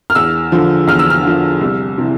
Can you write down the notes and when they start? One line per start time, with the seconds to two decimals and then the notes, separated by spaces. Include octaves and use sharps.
0.10 F6
0.15 E2 E6
0.52 D3 F3
0.87 E2 F6
0.99 E6
1.10 F6
1.24 D3 F3
1.61 C2
1.98 C3 E3